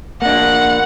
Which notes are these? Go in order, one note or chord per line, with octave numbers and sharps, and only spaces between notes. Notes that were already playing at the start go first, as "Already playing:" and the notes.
A#3 D4 F#5